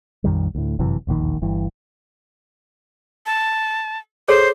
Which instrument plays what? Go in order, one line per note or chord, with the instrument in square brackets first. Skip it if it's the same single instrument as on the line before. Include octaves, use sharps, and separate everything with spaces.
[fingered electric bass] A#1 F2 D#3 G3
D2 A2
G1 F#2 C3 E3
E1 A#1 D#2 D#3
G1 G2 E3
[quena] A5
[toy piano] G#4 A4 C#5 [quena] C5